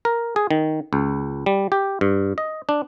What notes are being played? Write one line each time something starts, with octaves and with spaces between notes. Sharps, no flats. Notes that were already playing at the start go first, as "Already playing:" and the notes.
A#4
G#4
D#3
C#2
G3
G4
G2
D#5
D4